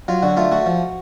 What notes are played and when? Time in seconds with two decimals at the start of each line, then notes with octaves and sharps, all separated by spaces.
0.08 F#3 F4
0.23 D3 F#4
0.37 A3 F4
0.51 A3 F#4
0.66 F3